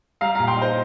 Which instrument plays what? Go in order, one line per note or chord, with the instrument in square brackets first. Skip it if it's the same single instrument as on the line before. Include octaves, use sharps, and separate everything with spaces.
[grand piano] G3 F5 A#5
A#2 F5 A#5
G5 C6
D#4 C5